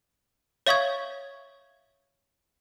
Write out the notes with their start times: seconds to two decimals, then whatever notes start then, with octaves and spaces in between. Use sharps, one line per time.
0.67 C#5 E5 F5 C#6 D#6 G#6